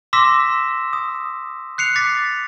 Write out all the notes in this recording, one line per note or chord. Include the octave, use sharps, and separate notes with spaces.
C6 D6 E6 A#6 B6 E7
D#6
F#6 C7 C#7 F7
D6 A6 B6